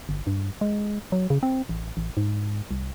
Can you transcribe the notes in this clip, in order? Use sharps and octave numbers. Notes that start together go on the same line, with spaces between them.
G1
G2
G#3
F#3
C#3
C4
A1
A1
G#2
C2